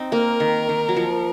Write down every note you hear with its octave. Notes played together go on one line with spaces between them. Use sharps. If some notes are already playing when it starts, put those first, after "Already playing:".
Already playing: C4 D#4
A#3 A#4
D#3
D#3
F#3
F3